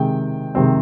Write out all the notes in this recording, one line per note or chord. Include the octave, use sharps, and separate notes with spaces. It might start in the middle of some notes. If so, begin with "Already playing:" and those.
Already playing: C3 D#3 G#3 C4 G5
C3 D#3 G#3 C4